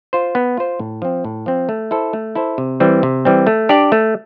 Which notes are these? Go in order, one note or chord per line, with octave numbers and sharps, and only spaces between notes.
F4 C5
B3
F4 C5
A2
F3 C4
A2
F3 C4
A3
E4 A4 C5
A3
E4 A4 C5
C3
E3 G3 C4
C3
E3 G3 C4
A3
D4 G4 D5
A3